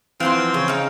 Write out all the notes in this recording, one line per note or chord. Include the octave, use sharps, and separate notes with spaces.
E3 F3 C4 F5 F#5 C6
C#3 G#4 C#5 D#7
D#4 F5